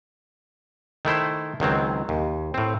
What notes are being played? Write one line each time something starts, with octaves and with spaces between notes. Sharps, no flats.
D#3 A3 E4 C5
C#2 D#3 F#3 C4
D#2
A2 C4